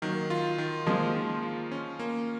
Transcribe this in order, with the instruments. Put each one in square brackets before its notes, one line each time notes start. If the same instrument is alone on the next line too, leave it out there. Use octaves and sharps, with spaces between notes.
[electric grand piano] D#3 [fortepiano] F#3 A#3
[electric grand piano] F4
D#3
[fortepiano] F3 G#3 [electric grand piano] A#3
[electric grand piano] D#3
F4
C#4
A#3